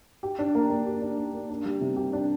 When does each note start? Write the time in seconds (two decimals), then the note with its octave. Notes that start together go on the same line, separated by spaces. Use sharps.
0.23 G4
0.39 D4
0.55 A#3
0.70 A#3
0.86 G4
1.02 D4
1.18 A#3
1.33 A#3
1.50 D4
1.65 G3
1.81 C3
1.97 G4
2.13 D4